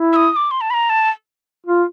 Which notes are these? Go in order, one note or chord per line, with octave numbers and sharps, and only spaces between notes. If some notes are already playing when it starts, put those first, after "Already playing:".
Already playing: E4
E6
D#6
D#6
D6
C6
A5
B5
A#5
A5
F4